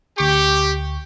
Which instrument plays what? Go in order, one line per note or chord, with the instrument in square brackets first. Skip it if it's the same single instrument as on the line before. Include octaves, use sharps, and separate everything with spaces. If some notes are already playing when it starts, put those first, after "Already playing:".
[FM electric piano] D2 C#6 [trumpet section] G4